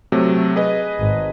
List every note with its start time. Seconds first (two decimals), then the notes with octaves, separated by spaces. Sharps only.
0.12 C3 F#3 A3
0.56 G#4 B4 D#5
0.99 G#1